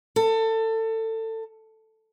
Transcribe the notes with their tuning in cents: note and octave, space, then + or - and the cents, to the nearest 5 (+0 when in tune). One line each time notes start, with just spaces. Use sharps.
A4 +25